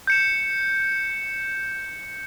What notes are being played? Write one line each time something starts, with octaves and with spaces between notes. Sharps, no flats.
G6 C#7 E7